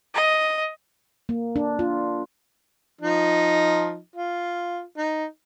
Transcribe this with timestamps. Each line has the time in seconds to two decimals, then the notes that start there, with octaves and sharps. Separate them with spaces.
0.15 D#5
1.29 A#3
1.56 D4
1.79 F4
3.01 F3 D#4
4.16 F4
4.97 D#4